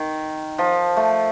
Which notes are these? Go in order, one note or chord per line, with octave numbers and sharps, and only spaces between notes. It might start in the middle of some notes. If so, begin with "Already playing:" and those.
Already playing: D#3
F3
A3